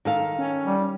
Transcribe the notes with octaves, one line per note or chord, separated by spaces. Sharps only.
D#3 A4 F5
C#4
G3